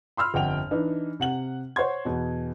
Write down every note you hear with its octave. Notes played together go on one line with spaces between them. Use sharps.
B5 C6 E6 F6
G1 F2 F#5 G5 F7
E3 D4 D#4
C3 F#5 F#7
C5 C#5 F#5 C6 G#6
E2 B2